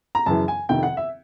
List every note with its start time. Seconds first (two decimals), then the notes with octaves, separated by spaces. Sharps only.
0.15 A#5
0.26 F#2 C#3 E3 A5
0.48 G#5
0.69 F1 F2 C3 D#3 G5
0.83 F#5
0.97 E5